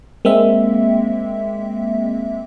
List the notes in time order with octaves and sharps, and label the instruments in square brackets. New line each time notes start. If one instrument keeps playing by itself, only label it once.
[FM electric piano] G#3 A#3 C4 E5